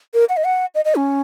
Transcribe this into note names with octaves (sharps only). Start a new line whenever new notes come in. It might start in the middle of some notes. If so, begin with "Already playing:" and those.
A#4
F#5
D#5
F#5
D#5
D#5
C#4